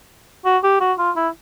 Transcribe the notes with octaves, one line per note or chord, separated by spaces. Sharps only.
F#4
G4
F#4
F4
E4